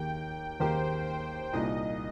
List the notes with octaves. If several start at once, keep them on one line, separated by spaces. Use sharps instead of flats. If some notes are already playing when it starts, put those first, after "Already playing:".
Already playing: D#2 D#3 A#3 G4 A#4 G5
D#2 D#3 A#3 G4 A#4 C5
C5
C2 A#2 A#3 D#4 D#5